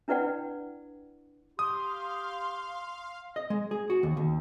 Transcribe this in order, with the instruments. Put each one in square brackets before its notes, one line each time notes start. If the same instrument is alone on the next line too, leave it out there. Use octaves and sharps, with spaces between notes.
[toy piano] D4 E4 B4 D5 F#5 G5
[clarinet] G4 [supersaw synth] F5 [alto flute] C6 [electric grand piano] D#6
[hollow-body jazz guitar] D#5
G#3
G#4
F#4
D#2
D#2